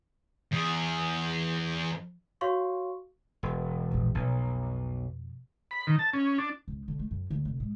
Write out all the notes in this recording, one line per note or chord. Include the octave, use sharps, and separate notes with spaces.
E2 G#4
F#4 C#5 F5 C6 C#6
E1
A#1 E2
B1 F2 B2
B5
D#3
A5
C#4
D4
C#2
D3
A3
F#2
D2
F1
G#2